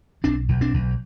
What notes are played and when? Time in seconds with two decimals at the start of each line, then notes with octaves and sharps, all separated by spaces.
0.24 B1 C4 D4
0.49 B1
0.61 C4 D4
0.74 B1